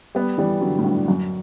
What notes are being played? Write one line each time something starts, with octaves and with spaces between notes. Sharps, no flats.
G3 B3
E3 G3
D3 F#3
A2
G2
F#2